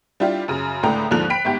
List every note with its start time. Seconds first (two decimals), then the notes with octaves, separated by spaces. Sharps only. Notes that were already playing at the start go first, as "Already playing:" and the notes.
0.20 G3 D4 E4 F4 G4
0.48 F#2 C#3
0.83 C#2 A2 D3 G5 A#5
1.11 D#2 G#2 D3 F3 F#6 F7
1.30 G5 B5 B6 D7
1.45 G1 G#2 G4 G6